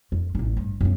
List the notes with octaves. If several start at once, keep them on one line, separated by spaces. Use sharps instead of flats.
F2
A1 D#4
G2
F#2 B3